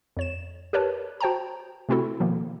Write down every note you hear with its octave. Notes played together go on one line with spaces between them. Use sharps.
F2 C#5 E7
G4 A#4 B4 C#5 A5
F#4 C5 G5 A5 A#5
C3 A3 C4 E4 F#4 A4
B2 D#3 F3 A#3